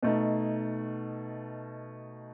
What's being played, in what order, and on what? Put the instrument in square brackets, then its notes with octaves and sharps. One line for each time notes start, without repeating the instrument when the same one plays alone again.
[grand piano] B2 A3 D#4